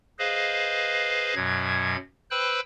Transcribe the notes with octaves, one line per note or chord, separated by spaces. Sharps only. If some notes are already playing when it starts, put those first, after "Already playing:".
G#4 B4 C5 D#5 F5
F#2 B2 F#3 G#6
B4 C5 G5 B5 E6 F#6